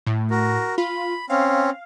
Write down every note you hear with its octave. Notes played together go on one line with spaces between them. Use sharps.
A2
F#4 A#4
F4 B5
C4 C#4 F5